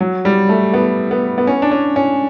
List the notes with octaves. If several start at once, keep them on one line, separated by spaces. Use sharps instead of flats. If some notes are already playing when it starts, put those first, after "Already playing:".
F#3
G3
A3
B3
B3
B3
C#4
D4
C#4
C#4